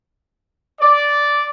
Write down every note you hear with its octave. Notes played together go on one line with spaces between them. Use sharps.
D5